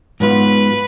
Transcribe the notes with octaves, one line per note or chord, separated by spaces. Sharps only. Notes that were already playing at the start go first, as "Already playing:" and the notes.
G#2 F#3 B3 F4 B4